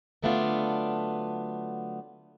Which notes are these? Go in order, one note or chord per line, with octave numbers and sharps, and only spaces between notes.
D3 F#3 A3 B3 D4 F4